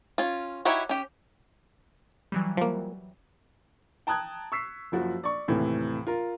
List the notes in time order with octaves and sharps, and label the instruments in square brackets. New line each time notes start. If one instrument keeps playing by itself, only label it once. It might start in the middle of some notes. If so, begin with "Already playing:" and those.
[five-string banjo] C#4 F4
D#4 E4 F#4 G4 C#5
C#4 G4
[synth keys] E3 F#3 G3
[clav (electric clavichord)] F3 A#3
[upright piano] G5 A5 A#5 D#6 F#6 G#6
C#6 E6 B6 C7
F#1 F3 F#4
D5 C#6
D#2 A2 C3 E3
F4 A#4